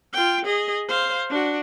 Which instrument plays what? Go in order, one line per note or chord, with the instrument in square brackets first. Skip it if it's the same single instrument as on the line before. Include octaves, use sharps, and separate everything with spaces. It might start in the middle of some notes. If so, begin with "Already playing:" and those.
[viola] F4 G5
G#4 D#5
C5 F5
D4 F#4